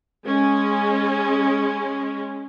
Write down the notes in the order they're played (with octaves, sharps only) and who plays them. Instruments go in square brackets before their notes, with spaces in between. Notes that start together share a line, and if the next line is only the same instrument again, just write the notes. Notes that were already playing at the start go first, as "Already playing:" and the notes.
[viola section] G#3 C#4